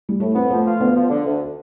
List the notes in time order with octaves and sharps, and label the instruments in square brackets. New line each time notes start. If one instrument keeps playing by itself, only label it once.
[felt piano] G3
[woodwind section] A2 [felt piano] A3
[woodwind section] B3 [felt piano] C4
[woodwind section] F3 [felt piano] A3
[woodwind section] F4
[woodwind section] D2 [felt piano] B3
[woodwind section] F3
D3
D2